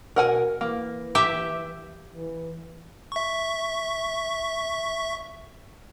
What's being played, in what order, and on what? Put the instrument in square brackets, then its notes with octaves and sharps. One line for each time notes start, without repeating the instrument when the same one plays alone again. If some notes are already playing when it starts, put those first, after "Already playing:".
[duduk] B2 [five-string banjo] A#4 F#5 G#5
[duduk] E3 [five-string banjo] A#3
[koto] G4 E5
[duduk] E3
[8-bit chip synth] E5 C#6